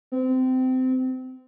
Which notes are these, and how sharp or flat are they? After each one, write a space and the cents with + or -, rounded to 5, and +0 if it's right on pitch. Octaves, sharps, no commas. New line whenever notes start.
C4 -25